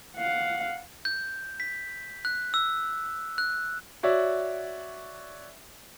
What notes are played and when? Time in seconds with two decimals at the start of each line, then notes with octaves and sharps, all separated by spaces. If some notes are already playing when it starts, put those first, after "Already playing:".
0.17 F5 F#5
1.05 G6
1.60 B6
2.25 F#6
2.54 E6
3.38 F#6
4.03 F#4 C#5 D5 E5